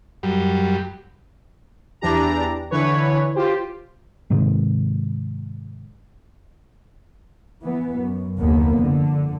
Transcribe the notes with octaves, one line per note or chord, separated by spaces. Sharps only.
F#2 G3
E2 E3 D4 G4 A#5
D3 E3 B4 C#5
F4 G4 C5
G#2 C3 D#3 G#3
E3 B3
F#2
F1 D#2 D3 A#3 B3
F2 D3